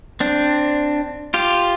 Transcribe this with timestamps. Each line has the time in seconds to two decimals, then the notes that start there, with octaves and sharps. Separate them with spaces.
0.20 C4 D4
1.34 F4 G4